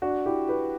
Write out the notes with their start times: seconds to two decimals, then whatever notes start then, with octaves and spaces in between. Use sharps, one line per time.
0.02 D4 F#4
0.26 E4 G4
0.49 G4 B4